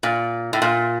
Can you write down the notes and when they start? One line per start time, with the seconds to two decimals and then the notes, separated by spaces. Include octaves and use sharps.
0.03 A#2
0.53 A2
0.62 A#2